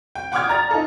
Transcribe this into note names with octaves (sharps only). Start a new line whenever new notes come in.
G5
F#5 G5 D6 D#6 F6 G#6
D5 A#5 A6
D#4 F4 A4